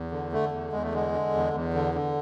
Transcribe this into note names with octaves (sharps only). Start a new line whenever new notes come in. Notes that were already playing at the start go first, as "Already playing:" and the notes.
Already playing: E2
D3
D3 A3
E2
E2 G#3
A3
D3 G#3
D3
E2
E2
D3
D3